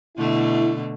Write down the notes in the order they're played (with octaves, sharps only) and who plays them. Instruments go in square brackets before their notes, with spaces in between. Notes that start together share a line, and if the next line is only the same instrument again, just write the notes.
[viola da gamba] B2 D3 A3 [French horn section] E4